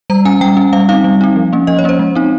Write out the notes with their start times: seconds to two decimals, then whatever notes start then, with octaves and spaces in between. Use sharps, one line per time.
0.10 G3 A#5
0.25 C#4 G#5
0.41 G3 G5
0.57 C#4
0.73 G3 F5
0.89 C4 D#4 F5
1.04 G3
1.21 C4 D#4
1.36 F3
1.53 A#3 C#4
1.67 F3 D#5
1.79 C#5
1.84 A#3 C#4 C5
1.99 G#3
2.15 C4 D#4